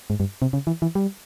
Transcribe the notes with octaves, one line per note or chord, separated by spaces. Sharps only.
G#2
G2
C3
C#3
E3
E3
G3